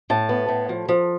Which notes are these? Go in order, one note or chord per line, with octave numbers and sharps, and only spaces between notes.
A2 A5
B3
A2
F3
F3